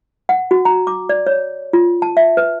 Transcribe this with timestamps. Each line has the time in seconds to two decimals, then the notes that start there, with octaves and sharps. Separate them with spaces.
0.29 F#5
0.51 F#4
0.65 A#5
0.87 D6
1.09 D5
1.27 C#5
1.73 F4
2.02 A5
2.17 E5
2.37 B4